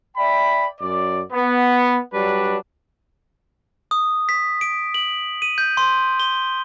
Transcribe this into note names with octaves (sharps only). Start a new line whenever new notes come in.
D5 E5 G5 B5
F#2 D5
B3
F#3 G3 D4 B4
D#6
B6
D7
F#7
D#7
G6
C6
G7